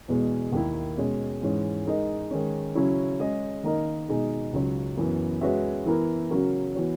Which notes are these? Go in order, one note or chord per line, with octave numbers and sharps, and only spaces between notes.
E2 B2 G#3
D#2 D#3 A#3 E4
B2 G#3 C#4
G#2 E3 G#3 C#4
G#3 D#4 A#4 D#5
D#3 G#3 C#4
C#3 F#3 C#4 E4
G#3 C#4 G#4 D#5
D#3 A#3 D#4 A#4 D#5
B2 G#3 D#4 G#4
C#2 C#3 F#3
F#2 E3 B3
G#3 C#4 F#4 B4 E5
E3 B3 E4 A#4
C#3 F#3 C#4 F#4 A#4
E3 B3 F#4 C#5